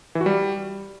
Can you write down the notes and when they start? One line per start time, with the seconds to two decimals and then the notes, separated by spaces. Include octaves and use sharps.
0.15 E3
0.21 F#4
0.26 G3